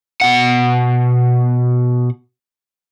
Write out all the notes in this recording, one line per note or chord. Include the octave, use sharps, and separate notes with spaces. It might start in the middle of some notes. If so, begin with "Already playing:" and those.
B2 F#5